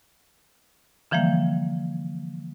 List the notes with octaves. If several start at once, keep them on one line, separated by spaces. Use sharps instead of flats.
D3 E3 F3 G3 A#3